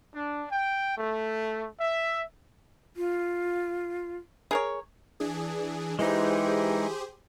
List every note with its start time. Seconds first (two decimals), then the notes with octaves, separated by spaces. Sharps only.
0.13 D4
0.51 G5
0.97 A3
1.80 E5
2.97 F4
4.51 G#4 A#4 C#5
5.20 E3 D4 G#4
5.99 E3 G#3 D#4 G4 G#4 C5